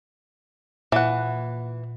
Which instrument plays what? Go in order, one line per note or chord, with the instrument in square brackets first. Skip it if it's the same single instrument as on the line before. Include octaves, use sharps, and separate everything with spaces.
[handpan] A#2 [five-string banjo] E3 F#5